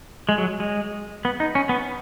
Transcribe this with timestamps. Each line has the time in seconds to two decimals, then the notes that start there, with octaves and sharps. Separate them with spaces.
0.29 G#3
0.38 F#3
0.60 G#3
1.25 B3
1.40 D#4
1.55 C#4
1.69 B3